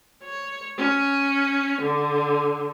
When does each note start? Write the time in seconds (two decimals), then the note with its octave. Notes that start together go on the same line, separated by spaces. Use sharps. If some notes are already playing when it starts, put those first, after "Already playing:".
0.23 C#5
0.78 C#4
1.82 D3